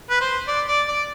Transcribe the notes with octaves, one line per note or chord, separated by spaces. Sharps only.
B4
C5
D5
D5
D5